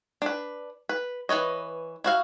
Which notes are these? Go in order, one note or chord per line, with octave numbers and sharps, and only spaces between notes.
D4 B4
B4
E3 B4 C#5 D#5
E4 F#4 F5